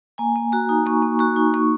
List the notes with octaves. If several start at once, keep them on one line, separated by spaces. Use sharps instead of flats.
A#3 G#5
A#3
F#4 A#5
D#4
A#3 C#6
A#3
F#4 C#6
D#4
A#3 C#6